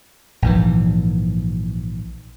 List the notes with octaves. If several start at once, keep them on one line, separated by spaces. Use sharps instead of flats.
A#1 G#2 E3